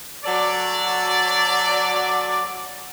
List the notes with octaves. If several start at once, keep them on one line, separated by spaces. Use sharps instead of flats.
F#3 F#4 A4 D5